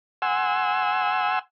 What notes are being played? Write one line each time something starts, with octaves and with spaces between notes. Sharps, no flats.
F#5 G#5 C6 E6